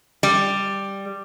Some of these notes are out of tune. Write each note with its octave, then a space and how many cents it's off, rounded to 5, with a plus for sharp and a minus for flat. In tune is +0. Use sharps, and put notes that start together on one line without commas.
G3 +5